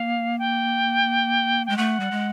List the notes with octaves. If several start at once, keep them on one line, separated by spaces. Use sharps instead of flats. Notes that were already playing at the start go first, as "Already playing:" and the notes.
Already playing: A#3 F5
G5
G#3 G5
A3 F#5
G3
G#3